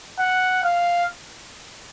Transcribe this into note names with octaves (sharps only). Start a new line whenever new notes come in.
F#5
F5